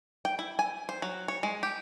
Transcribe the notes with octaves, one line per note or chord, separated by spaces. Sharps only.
G5
E4
G#5
C5
F#3
C#5
G#3
G4